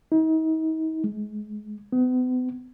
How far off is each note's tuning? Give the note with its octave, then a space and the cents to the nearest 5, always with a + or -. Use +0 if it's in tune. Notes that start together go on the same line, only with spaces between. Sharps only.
D#4 +40
G#3 +30
B3 +40